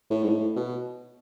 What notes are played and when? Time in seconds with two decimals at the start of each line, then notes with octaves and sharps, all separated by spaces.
0.10 A2
0.23 G#2
0.29 A2
0.56 B2